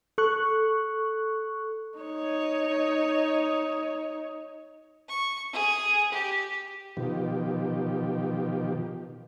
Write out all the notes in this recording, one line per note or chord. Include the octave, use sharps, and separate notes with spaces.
A4 C#6 F#6
D#4 C#5
C#6
G#4
G4
B2 D#3 F3 G4